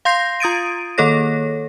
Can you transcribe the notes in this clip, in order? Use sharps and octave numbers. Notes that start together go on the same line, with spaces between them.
F5 C6 G6 A#6 C7
F4 D#6 A6 D7 D#7
D#3 A#3 A4 C#5 A#6